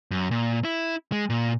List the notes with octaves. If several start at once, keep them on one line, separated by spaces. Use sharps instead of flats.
F#2
A#2
E4
G#3
A#2